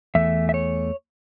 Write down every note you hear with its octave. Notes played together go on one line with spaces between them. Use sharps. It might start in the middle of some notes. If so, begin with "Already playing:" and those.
E2 E3 A3 E5
E5
C#5